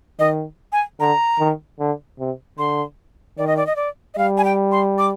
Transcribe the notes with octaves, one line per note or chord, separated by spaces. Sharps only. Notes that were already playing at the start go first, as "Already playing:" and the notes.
D#3 D#5
G#5
D3 A#5
D#3
D3
C3
D3 C6
D#3 D5
D#5
D5
D#5
D5
D#5
G3 F5
G#5
G5
C6
D6